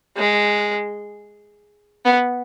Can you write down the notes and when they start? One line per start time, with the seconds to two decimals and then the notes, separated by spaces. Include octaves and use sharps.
0.17 G#3
2.05 B3